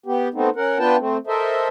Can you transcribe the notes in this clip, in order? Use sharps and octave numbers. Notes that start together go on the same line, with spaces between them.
B3 G4
A3 B3 C4 D#4
C#4 A#4 F#5
B3 D4 F4 B4 G5 A5
A3 C4
A4 A#4 C5 D#5 E5